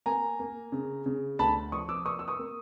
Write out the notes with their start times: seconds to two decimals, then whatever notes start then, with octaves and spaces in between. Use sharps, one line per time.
0.06 A#3 G#5 A#5
0.39 A#3
0.72 C#3
1.06 C#3
1.39 D2 A5 B5
1.72 F3 C#6 D#6
1.89 D6 E6
2.05 A#3 C#6 D#6
2.19 E6
2.28 C#6 D#6
2.39 A#3